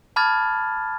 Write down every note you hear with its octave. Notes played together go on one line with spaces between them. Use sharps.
A5 B5 D6 F6 G#6 A6